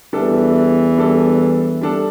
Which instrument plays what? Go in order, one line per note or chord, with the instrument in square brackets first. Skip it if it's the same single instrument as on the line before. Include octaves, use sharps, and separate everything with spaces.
[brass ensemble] E2 E3 [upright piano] G3 D4 A4
[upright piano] G3 D4 A4
G3 D4 A4